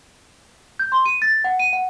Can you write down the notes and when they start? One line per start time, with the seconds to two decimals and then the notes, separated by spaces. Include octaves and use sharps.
0.79 G6
0.92 C6
1.06 D#7
1.22 A6
1.44 F#5
1.59 D#7
1.73 F#5